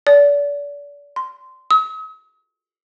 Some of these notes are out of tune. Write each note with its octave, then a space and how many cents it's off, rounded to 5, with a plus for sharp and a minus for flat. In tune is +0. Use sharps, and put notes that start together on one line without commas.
D5 -35
C6 -15
D#6 +45